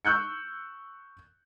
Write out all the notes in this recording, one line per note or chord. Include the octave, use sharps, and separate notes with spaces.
C#6 E6 F#6 G6 C#7